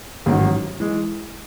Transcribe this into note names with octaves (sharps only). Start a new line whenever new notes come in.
A1 G#2 D#3 F#3
E3 G#3